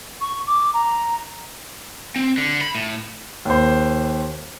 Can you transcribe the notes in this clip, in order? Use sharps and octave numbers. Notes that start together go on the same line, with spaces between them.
C#6
D6
A#5
C4
D3
B5
A2
D#2 C5